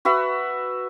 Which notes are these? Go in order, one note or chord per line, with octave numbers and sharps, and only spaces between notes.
F#4 B4 E5 F#5